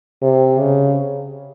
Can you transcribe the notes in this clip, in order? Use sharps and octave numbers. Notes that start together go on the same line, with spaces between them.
C3
C#3